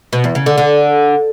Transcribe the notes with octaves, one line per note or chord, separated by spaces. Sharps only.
B2
E2
C#3
D3
D3